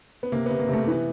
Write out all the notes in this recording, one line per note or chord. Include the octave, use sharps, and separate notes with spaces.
B3
C3 A#3
C3 B3
A#3
C3 A3
E3 B3